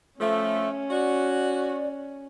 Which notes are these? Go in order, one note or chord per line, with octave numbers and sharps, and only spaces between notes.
F3 A3 C#4 E5
F#4 D5